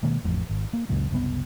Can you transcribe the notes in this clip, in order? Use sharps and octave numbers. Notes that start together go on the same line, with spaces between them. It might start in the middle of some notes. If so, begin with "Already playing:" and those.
B2 D#3 G#3 A#3
A1 F2 A2
G#1
A#3
C#2 F#2 A#2
F#1 C2 B2 B3